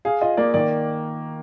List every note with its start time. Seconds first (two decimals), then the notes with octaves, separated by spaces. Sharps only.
0.05 G#4 F5
0.21 F4 D#5
0.37 A#3 D5
0.54 D#3 D5